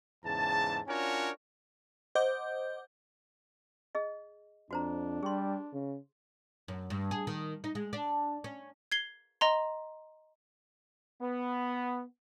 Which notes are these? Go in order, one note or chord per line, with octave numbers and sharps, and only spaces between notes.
E2 G#2 C#3 A5
C#4 D4 F4 F#4 A#4 C#5
C5 D#5 F#5 D6 G6
G#4 D#5
F2 D4 F#4 C5 A#5
G3 G#4 C6
C#3
F#2
G2
G#4
D#3
D#4
G#3
D4
C#4
G#6 C7 G7
D#5 A#5 C6
B3